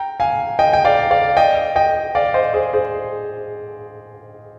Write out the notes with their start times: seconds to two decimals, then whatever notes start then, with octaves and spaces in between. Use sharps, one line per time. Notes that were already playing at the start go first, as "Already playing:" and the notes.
Already playing: G5 A#5
0.20 F5 G#5
0.59 D#5 G5
0.73 G5
0.85 D5 F5
1.11 D5 F5
1.37 D#5 G5
1.76 D#5 G5
2.15 D5 F5
2.34 C5 D#5
2.54 G#4 C5
2.73 G#4 C5